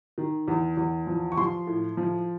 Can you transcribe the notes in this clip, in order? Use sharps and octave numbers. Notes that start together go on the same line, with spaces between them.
D#3
E2
E2
F3
C#6
F3 C6
A2
F3